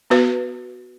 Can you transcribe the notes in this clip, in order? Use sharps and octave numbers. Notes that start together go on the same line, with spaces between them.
B3 F#4 B4